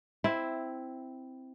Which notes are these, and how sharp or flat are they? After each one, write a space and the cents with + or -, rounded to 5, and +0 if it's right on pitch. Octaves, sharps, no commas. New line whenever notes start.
C4 -5 E4 +0